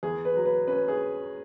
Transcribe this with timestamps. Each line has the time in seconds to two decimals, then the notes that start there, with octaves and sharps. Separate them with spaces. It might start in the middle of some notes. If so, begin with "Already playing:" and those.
0.03 E2 G#4
0.25 B4
0.36 F#3
0.46 B4
0.67 C#4 B4
0.88 G#4